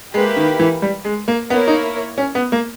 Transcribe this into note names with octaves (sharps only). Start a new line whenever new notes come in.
G#3 A#3 E4 G4 B4
D#3
E3
G3
G#3
A#3
A#3 B3 E4 A#4 C#5
D#4
C#4
B3
A#3